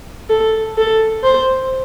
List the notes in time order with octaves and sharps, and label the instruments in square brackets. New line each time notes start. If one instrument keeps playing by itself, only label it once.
[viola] A4
A4
C5